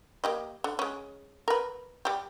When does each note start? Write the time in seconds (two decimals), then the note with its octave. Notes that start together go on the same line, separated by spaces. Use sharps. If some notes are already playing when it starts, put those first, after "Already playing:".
0.24 A#3 G4 D#5
0.64 D3
0.79 G#3 C#4
1.48 A#4 B4
2.05 G3 G4